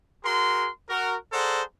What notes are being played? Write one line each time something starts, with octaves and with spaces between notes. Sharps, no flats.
F#4 G#4 A#4 C6
F#4 A#4
G#4 A4 C5 D5 F#5 A#5